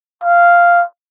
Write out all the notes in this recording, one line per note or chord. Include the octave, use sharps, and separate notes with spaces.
F5